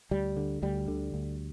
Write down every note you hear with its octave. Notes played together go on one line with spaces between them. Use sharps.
D2 G3
D3
D2 G3
D3
D2